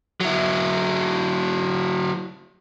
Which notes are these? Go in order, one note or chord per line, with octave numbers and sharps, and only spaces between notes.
F#3 E4